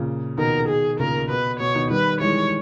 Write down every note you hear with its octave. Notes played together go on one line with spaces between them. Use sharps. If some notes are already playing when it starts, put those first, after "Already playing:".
Already playing: A#2 C#3
B2 D#3 A#4
G#4
A#2 C#3 A#4
B2 B4
B2 C#5
B2 D#3
D#3 G3 B4
E3 G#3 C#5